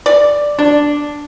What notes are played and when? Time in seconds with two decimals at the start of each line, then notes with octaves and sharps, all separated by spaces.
0.06 D5
0.59 D4